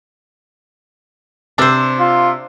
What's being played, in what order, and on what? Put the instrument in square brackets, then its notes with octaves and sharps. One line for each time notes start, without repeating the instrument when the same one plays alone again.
[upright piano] C3 E6 [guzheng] D4 C5
[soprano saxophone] F4